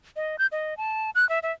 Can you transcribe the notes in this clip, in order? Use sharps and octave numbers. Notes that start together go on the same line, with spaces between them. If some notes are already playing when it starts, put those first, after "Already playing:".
D#5
G6
D#5
A5
F#6
E5
E5